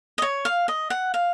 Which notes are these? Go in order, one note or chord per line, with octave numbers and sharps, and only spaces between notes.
D#5
C#5
F5
D#5
F#5
F5